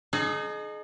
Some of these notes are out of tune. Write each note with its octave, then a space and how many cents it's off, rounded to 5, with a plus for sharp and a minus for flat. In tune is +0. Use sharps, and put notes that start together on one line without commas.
D#4 -25 G#4 +35